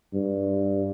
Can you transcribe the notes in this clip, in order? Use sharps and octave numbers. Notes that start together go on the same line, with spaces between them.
G2